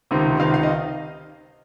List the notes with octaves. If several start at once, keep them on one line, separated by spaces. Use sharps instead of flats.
C#2 C3 D#3
C#2 C3 D#3 F5
F5
D#5